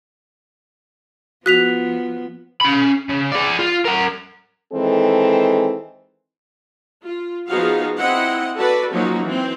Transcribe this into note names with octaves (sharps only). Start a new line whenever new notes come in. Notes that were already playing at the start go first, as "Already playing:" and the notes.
F3 B3 F#4 F#6 B6 F7
C#4 B5
C#3
G#4 D5
F4
A#4 F#5
D#3 E3 G#3 C4 A4
F4
F3 B3 D#4 F#4 G#4 F5
C4 E4 D#5 F#5
F#4 A4 B4 D5
F3 F#3 A#3 C#4 D#4 F#4
E3 C4